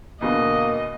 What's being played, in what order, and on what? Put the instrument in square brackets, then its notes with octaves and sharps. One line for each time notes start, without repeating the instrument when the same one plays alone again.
[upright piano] E2 B2 D3 [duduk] A#3 [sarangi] D#5